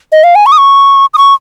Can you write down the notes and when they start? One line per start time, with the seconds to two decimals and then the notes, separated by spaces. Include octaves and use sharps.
0.12 D#5
0.24 F5
0.35 G#5
0.46 C#6
0.52 D#6
0.58 C#6
1.14 D#6
1.18 C#6